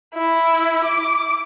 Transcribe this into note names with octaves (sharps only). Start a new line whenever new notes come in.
E4
D6